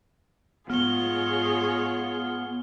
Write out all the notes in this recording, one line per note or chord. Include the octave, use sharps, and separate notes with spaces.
G#2 B3 F4 G#4 C#5 F6 G7